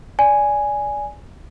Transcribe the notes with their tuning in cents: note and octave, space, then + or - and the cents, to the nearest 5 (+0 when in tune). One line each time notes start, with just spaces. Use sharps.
D5 -15 G#5 +0